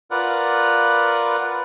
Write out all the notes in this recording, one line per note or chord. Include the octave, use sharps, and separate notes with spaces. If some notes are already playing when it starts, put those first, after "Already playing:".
F4 A#4 B4 D5 F#5